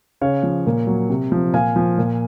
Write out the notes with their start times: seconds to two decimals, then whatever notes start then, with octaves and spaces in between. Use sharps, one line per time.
0.21 C#3 C#5 F5
0.43 F3
0.66 A#2
0.87 F#3
1.09 C3
1.32 F3
1.53 A#2 F5 G#5
1.76 F3
1.98 A#2